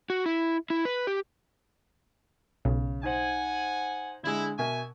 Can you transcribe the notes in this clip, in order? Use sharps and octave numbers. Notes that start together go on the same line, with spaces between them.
F#4
E4
E4
B4
G4
B1 C#3
D#4 C5 F#5 G#5
D3 G#3 E4
B2 A#4 E5 G#5